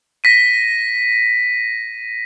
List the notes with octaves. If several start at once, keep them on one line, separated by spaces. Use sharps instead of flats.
A#6 B6 D#7